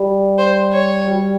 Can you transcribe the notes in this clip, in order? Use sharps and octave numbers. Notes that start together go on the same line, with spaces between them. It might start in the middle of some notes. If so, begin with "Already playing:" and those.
Already playing: G3
C5
C#5
G3